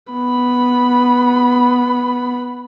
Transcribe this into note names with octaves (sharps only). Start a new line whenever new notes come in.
B3 B5